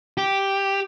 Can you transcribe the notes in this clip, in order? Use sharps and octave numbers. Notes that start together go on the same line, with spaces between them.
G4